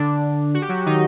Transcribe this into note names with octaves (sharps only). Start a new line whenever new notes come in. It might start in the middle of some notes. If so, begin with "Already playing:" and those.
Already playing: D3 D4
F#4
G4
F#3 F#4
D#3 D#4